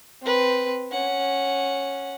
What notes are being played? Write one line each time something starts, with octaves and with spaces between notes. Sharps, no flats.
C4 B4
C#4 F#5